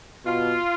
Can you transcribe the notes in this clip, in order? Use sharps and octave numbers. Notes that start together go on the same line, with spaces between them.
B2 F4